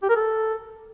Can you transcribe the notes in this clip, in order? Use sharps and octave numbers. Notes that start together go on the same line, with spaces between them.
G4
A#4
A4